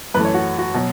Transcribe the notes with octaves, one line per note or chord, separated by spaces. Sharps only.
F#2 E3 A3 B4
C#5
F#4
F#4
B2 F#3